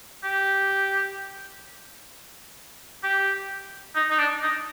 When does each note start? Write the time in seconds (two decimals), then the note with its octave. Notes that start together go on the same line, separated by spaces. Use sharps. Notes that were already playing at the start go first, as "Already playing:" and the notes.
0.24 G4
3.03 G4
3.95 D#4
4.10 D#4
4.19 D4
4.43 D#4